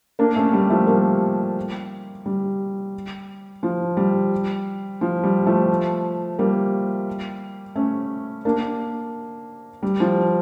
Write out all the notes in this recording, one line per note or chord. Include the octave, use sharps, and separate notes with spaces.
A#3 D4
A3 C#4
G3
F3 A3
G3 A#3
G3
F3
G3
F3
G3
F3 A3
G3 A#3
A3 C#4
A#3 D4
G3
F3